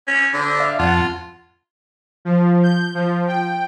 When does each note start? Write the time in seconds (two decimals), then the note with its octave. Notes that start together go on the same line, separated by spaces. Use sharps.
0.08 C#4
0.34 D3
0.60 D5 E5 F5
0.79 F2 F4 F#5 A5
2.25 F3
2.63 G6
2.95 F3
3.27 G5